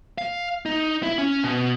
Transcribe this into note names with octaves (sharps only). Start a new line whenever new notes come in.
F5
D#4
E4
C#4
B2